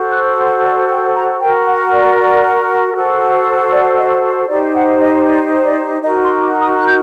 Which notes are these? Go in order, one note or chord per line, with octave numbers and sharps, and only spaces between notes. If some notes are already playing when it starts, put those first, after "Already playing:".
Already playing: F#4 A4 C5
F#6
C6
D5
G5
A#5
F#4 A#4 G5
F#5
D5
F#4 A4 C5
D5
D#5
D#4 G4 C5 D5
F#5
D#5
D5
D5
D#4 F#4 A#4 D#5
C6
D6
D#6
F#6
G6